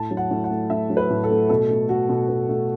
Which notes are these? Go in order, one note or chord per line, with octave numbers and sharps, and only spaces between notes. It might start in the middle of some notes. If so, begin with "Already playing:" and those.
Already playing: A2 A5
F#3
F#5
A2
F#5
A3
A2 E5
F#3
B4
A2
A4
A3
B2 A4
A3
A3 F#4
B2
B2
A3